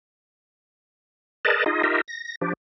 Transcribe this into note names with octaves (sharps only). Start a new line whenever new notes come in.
G#4 A#4 B4 D5 D#5 A5
D#4 F4 G#4 D#5
D#4 F4 G4 A#4 D#5 E5
A#6
F3 D4 G4